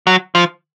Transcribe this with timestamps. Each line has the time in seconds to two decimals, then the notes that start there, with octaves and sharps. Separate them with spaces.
0.07 F#3
0.35 F3